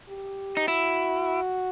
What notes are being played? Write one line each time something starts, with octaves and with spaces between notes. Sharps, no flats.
G4
D#4
E4 F#4